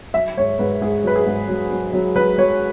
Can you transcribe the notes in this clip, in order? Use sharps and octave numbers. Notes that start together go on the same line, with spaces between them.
F#3 E5
G#2 C#5
G#2 B4
G#2 G#4
F#3 B4
G#4
G#2
F#3
F#3
F#3
F#3 B4
F#3 C#5